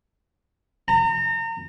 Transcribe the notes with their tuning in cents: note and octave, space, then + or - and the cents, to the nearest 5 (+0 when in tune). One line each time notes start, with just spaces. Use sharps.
A#5 -35